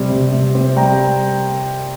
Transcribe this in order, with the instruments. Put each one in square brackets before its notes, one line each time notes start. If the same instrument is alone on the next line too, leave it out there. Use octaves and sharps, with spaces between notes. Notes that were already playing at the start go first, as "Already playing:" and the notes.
Already playing: [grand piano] C3 G3 C4
C3
C3
C4
G3 G5 A#5